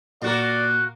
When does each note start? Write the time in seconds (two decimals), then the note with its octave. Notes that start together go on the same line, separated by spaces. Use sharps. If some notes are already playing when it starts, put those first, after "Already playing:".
0.22 A#2 A#3 F#4 A#4 D5